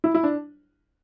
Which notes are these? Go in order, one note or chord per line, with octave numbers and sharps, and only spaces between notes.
E4
E4
D4